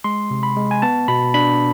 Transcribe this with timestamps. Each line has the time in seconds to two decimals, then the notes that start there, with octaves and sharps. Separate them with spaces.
0.04 G#3 C6
0.31 C3
0.43 B5
0.57 G#3
0.71 G#5
0.82 B3 A5
1.08 B2 B5
1.34 D4 B5